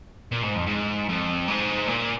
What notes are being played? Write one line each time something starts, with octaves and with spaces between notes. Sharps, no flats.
A#2
G#2
F2
G#2
F2
G#2
A#2